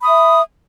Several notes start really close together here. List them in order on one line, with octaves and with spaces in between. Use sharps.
B5 D#6 E5